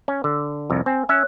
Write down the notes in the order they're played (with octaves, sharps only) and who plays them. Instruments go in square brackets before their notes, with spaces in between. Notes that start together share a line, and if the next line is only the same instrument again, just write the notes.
[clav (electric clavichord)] C#4
D3
C2 F2
[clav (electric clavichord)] C4 [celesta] G#5
[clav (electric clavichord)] C#4 E5 [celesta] C#5 F#6